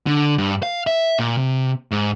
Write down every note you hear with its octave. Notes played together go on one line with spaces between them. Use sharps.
D3
G2
F5
E5
A#2
C3
G#2